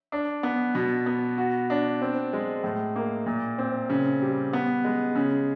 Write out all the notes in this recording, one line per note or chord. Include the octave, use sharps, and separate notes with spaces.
D4
B3
B2
B3
F#4
D4
C4
G#3
A2
A#3
A#2
C4
C#3
G3
B3
G#3
C#3